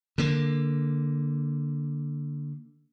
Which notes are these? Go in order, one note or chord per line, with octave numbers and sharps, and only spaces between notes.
D3 A#3